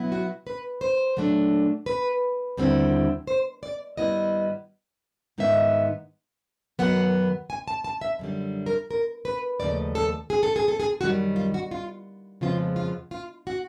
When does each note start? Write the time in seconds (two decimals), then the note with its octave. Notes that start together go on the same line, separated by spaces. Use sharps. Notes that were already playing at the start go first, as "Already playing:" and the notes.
Already playing: B2 F#3 B3 E4
0.12 F#4
0.47 B4
0.81 C5
1.16 A#2 F#3 A3 D4
1.86 B4
2.57 D#2 D3 G3 C4 E4
3.27 C5
3.63 D5
3.97 G2 D#3 G3 B3 E4 D#5
5.38 G#2 D#3 G#3 B3 D#4 E5
6.79 F#2 D#3 F#3 B3 F#5
7.50 G#5
7.68 A5
7.84 A5
8.01 E5
8.19 F#2 D3 G3
8.66 A#4
8.91 A#4
9.25 B4
9.60 D#2 C#3 F3 A3 D5
9.95 A4
10.30 G#4
10.43 A4
10.56 G#4
10.68 A4
10.80 G#4
11.01 F#2 D#3 G3 F#4
11.36 F4
11.54 F#4
11.71 F4
12.41 F2 C#3 F3 G#3 B3 F4
12.76 F4
13.11 F4
13.47 F#4